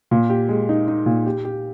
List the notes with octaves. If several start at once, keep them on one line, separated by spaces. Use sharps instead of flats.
A#2
G4
G#3
D#4
D#4
A#2
G4
G4